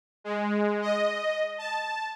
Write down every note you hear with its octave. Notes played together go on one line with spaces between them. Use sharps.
G#3
D#5
A5